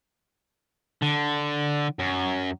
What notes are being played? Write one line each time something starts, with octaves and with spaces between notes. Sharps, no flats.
D3
F#2